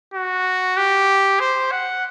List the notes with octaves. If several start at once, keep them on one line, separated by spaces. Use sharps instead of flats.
F#4
G4
C5
F#5